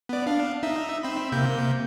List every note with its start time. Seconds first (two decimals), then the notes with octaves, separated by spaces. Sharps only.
0.09 B3 D5
0.27 D4 F5
0.63 D#4 E5
1.03 C4 E5 B5
1.32 C3 A#3 G6